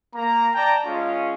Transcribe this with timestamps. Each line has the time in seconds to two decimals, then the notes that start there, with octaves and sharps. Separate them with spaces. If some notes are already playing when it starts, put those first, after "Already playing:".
0.15 A#3 A#5
0.55 D5 G5 A5 A#5
0.86 G#3 C#4 F4